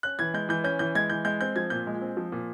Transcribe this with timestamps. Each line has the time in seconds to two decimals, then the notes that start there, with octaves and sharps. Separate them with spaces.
0.03 C#4 F#6
0.19 E3 G#6
0.34 G#3 G6
0.49 E3 G6
0.64 C#4 G6
0.79 E3 G6
0.95 G#3 G#6
1.10 E3 G6
1.25 G#3 G6
1.41 C4 G6
1.56 F3 G#6
1.70 A#2 G6
1.87 G#3
2.02 C4
2.17 F3
2.32 A#2